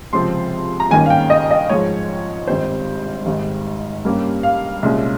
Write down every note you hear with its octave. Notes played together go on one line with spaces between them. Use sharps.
C#2 C3 F3 C4 C6
A#5
G#1 G2 D#3 A#3 C#4 G#5
F5
G5
D#5
D#5
G#2 F3 G#3 C#5
G#1 G2 G3 C4 C5
G#1 G#2 G3
G2 G3 A#3 C#4
F5
C2 A#2 G#3 C#4